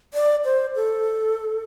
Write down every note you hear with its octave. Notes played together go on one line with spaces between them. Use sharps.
D5
C5
A4